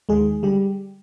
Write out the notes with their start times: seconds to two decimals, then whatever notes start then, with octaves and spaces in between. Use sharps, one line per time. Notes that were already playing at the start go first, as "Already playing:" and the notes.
0.09 D#2 D#3 G#3 G#4
0.43 D3 G3 G4